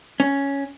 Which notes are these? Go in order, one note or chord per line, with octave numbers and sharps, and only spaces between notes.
C#4